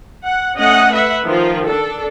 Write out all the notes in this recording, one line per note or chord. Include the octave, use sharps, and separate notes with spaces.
F#5
A3 C#4 D#5 F#5
B4 E5 F#5
D#3 F3 F4
D4 A4